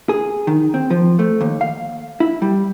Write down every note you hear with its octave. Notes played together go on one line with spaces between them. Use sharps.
G#4
D#3
C4
F3
A3
D#2
F5
E4
G3